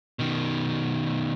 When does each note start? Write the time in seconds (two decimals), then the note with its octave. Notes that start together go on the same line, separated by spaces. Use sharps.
0.19 B2 D#3